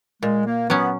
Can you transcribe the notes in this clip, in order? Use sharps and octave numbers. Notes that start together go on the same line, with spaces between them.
A#2 G#3
A#3
F#3 B3 C#4